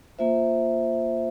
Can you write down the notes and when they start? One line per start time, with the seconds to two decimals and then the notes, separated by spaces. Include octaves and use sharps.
0.19 A#3 F4 C5 E5